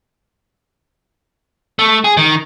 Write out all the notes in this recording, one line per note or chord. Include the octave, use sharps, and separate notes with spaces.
A3
G#4
D#3